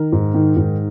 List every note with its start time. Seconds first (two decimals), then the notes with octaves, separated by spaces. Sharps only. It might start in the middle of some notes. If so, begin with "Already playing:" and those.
Already playing: D#3 A#4
0.12 G#2
0.34 D#3
0.56 G#2